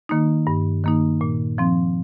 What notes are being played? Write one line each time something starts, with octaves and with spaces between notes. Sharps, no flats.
D#3 A#3 D#4
G2
D#3 A#3 D#4
A#2
F3 C4